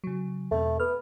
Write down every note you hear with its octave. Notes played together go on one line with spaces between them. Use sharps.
C#3 F#3
E2 B2 A3 C4
B3 F6